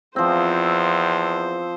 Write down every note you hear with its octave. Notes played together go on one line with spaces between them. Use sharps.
E2 F3 C4 C5